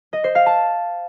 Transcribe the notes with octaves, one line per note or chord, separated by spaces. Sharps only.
D#5
C5
F5
A5